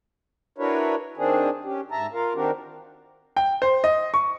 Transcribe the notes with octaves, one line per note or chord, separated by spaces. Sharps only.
D4 E4 F#4 A#4 B4 C#5
D#3 C4 D4 G#4
C#4 G4
G#2 E5 A5 A#5
F4 A#4 F5
D#3 C4 D4 F#4 G4 A#4
G5
C5
D#5
C#6